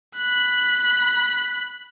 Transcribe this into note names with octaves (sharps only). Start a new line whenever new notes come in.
B5 F#6